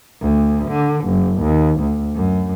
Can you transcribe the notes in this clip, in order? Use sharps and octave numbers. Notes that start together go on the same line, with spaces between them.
D2
D3
F#1
D#2
D2
F#2